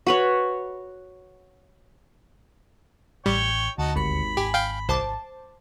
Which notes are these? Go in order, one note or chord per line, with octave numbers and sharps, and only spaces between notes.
F#4 B4 C#5
A1 G3 C#5 G5
D2 D#4 F#4 A5
G#1 D#2 B5 C#7
G#1 G4 G#5
F5 G5 G6
C2 C5 A5 D6